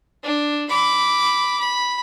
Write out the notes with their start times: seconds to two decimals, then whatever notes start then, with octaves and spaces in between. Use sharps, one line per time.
0.23 D4
0.69 B5 D6
1.59 B5